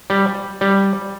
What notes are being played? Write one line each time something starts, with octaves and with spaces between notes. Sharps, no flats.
G3
G3